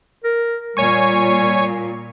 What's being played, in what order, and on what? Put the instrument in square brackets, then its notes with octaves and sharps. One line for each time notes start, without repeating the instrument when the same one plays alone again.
[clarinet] A#4
[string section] A#2 [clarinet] G3 [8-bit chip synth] C#5 G#5 C#6